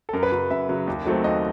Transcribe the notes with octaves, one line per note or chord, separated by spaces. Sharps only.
A4
F#2 A#4
B4
C#3 F#3
F#2 E5
C#3 F#3
D#2
D#3 F#3 A3 C4
D#2 D#5